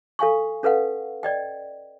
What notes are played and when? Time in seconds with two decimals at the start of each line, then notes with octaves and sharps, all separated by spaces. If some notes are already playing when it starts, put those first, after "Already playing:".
0.19 A4 F5 G#5 C#6
0.63 C#4 A4 B4 F5 F#5
1.23 D5 D#5 G5